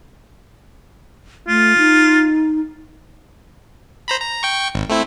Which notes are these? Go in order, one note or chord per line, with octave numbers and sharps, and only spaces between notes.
A3 F4
D#4
C5 A#5 B5
A#5
G5 C#6
G#1
A3 C4 E4